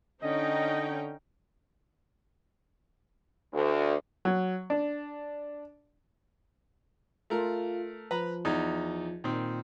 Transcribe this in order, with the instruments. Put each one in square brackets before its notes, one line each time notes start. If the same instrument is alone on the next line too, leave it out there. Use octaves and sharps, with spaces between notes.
[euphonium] D3 [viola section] C#4 D#4 G5 [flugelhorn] D#5
[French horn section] D2
[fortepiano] F#3
D4
[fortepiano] A3 A#4 [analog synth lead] F4
[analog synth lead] F3 [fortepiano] B4 A#5 B5
[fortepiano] E2 D#4 D#6
[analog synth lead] A#2 [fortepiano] D#3 C4